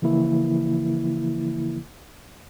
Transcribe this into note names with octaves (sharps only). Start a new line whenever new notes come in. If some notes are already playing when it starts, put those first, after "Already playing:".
C#3 E3 F3 A#3 E4